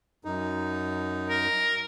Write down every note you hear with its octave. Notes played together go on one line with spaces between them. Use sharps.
F#2 D#4
A#4